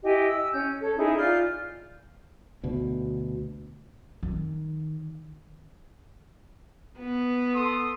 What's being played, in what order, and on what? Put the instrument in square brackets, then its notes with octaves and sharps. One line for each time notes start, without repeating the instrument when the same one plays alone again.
[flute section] E4 G4 D#5 G#5
E6
C#4 G6
A4 C#5
C#4 D#4 E4 G#4
F4 D5 F6 G6
[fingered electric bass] D2 B2
[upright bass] D#3
[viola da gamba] B3
[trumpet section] A4 C6 D#6